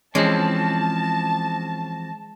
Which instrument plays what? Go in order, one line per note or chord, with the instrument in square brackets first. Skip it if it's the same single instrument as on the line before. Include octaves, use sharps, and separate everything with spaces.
[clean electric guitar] E3 F3 C4 [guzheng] G#3 [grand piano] C#4 [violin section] A5